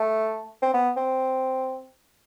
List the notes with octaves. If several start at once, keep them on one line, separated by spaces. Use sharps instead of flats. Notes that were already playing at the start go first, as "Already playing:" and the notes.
Already playing: A3
C4
B3
C4